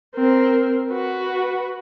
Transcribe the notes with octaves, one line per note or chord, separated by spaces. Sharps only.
C4 A#4
F#4 B4